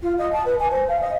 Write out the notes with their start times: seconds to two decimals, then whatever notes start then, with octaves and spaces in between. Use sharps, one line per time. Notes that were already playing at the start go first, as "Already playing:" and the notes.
0.02 F4
0.18 D#5
0.32 A5
0.45 B4
0.59 G#5
0.71 C5
0.88 F5
1.01 D#5